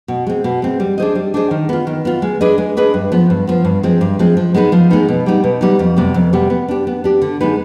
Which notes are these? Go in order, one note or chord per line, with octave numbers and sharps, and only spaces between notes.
B2
G#3 C4
B2
G#3 C4
G3
D4 G#4 C5 D#5
G3
D4 G#4 C5 D#5
D#3
B3 F4
D#3
B3 F4
G#3
D4 G#4 B4 D#5
G#3
D4 G#4 B4 D#5
G2
F3 B3
G2
F3 B3
G2
F3 G#3 C4
G2
F3 G#3 C4
F3
G#3 B3 D#4 B4
F3
G#3 B3 D#4 B4
B2
G3 B3 D#4
B2
G3 B3 D#4
F2
C3 G3 B3
F2
C3 G3 B3
B3
D4 G4
B3
D4 G4
D3
G#3 B3 D#4 B4